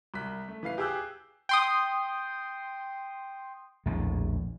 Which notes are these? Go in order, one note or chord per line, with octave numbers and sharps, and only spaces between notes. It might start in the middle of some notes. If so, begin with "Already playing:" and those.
C2 F#6 B6
A3
E3 B4 F5 C7
G4 G#4 D6 E6 F#6 G6
G5 C6 D#6
A#1 E2 A2